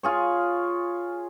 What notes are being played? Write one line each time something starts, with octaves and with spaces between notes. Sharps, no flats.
F4 G#4 C#5